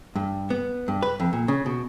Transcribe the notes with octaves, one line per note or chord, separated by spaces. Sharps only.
G2
B3
G2
B4
F2
A#2
C#3
B2